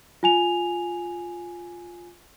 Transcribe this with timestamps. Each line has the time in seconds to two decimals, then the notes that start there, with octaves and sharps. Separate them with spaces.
0.23 F4 G#5 F7